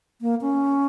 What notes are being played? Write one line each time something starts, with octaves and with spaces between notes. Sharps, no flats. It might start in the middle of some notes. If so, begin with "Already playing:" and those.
A#3
C#4